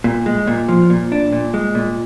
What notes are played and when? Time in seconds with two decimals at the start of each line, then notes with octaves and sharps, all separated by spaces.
0.04 A#2
0.26 G#3
0.47 A#2
0.68 F3
0.90 A#2
1.12 D4
1.33 A#2
1.54 G#3
1.75 A#2